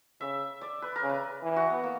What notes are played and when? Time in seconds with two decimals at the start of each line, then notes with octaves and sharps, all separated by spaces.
0.21 C#3 E5
0.61 D5
0.82 B4
0.96 A#4
1.02 C#3
1.09 B4
1.43 E3
1.56 F#4
1.70 B3
1.84 A#3